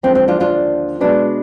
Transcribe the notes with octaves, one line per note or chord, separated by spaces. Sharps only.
D#2 D3 F3 G#3 C4
C4
D4 F4
D4 F4
B2 G#3 B3 D4